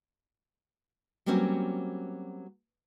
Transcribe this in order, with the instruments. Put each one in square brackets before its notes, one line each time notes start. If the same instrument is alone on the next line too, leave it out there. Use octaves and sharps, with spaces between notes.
[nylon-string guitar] F#3 G3 A#3 C4 C#4 F#4